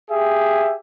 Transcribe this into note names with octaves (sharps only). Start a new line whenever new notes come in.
G4 G#4 E5